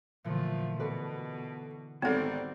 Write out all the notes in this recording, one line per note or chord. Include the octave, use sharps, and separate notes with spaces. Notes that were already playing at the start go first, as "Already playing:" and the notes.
A#2 D3 E3 F3 A3
B2 A4 B4 D5
G#1 G3 B3 C4 A4 F#5 A6